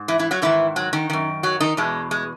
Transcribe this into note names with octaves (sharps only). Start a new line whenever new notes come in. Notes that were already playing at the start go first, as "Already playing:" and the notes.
Already playing: G#2
E3 E4
E3 E4
F#3 F#4
G#2 D#3 E3 E4
F#3 F#4
D#3 D#4
F#2 D#3
F#3 F#4
D#3 D#4
E2 B2 G#3
G#3